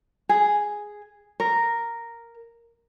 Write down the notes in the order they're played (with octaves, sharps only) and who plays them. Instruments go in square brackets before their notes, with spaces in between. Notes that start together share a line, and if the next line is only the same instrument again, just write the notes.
[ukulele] G#4
A#4